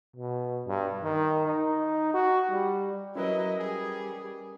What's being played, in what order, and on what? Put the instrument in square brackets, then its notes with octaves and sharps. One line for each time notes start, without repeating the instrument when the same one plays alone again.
[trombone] B2
G2
D#3
D#4
F#4
G3
[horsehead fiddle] F#3 D#5 [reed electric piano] C#4 A#4 B4 [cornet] E4
[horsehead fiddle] G3 [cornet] G#4